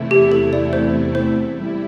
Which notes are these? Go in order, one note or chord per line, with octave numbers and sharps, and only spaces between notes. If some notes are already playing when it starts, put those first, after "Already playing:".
Already playing: E2 C3 A3 E4
G4
A4
D5
C5
C5
G3 E4